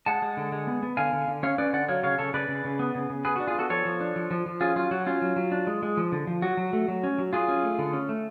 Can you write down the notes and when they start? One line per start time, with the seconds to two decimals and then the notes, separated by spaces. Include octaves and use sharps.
0.06 G#3 F#5 A5
0.22 G#3
0.37 D3
0.52 G#3
0.67 B3
0.83 B3
0.97 D3 F5 G#5
1.13 D3
1.28 D3
1.43 C#4 C#5 F5
1.58 C#4 B4 D5
1.73 D3 D5 F#5
1.88 F#3 C#5 F5
2.03 C#3 C#5 F5
2.18 C#3 A4 C#5
2.34 C#3 B4 D5
2.49 C#3
2.65 C#3
2.79 B3
2.95 C#3
3.10 C#3
3.25 B3 G#4 B4
3.36 F#4
3.40 D4
3.47 F4 G#4
3.55 B3 F#4 A4
3.70 F3 A4 C#5
3.85 F3
4.01 D4
4.16 F3
4.31 F3
4.46 F3
4.61 C#4 F4 G#4
4.76 F#3 F4
4.91 F#3 F#4
5.06 C#4 F4
5.22 F#3
5.36 F#3
5.52 D4
5.67 G#3
5.83 G#3
5.97 F3
6.12 D3
6.27 F3
6.42 F#3 F#4
6.57 F#3
6.73 A3
6.88 F#3
7.04 C#4
7.18 F#3
7.33 F#3 F4 G#4
7.48 C#4
7.63 A3
7.79 D3
7.93 C#4
8.09 A3